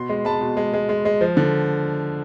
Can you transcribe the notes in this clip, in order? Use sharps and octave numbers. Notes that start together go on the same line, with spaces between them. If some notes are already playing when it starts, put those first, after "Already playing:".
Already playing: B2 C6
G#3
G#3 A5 B5
B2
G#3
G#3
G#3
G#3
F3
D3